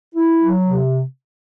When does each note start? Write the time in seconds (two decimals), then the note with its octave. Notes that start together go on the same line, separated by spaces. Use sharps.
0.15 E4
0.41 F#3
0.66 C3